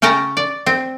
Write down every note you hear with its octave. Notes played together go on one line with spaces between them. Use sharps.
C#3 C#4 G5 A5 A#5
D5
C4